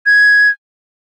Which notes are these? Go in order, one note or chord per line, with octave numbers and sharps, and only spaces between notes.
G#6